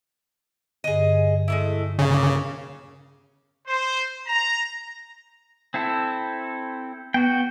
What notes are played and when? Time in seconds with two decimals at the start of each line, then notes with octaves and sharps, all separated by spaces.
0.84 G2 D3 G#4 D#5
1.48 G#3 A3 E4
1.99 C#3 A#4
2.13 A#3
3.68 C5
4.27 A#5
5.74 C4 E4 A4
7.14 B3 F#4 G5